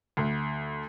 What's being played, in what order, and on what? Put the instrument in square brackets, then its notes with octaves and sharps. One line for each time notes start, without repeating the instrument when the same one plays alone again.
[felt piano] D2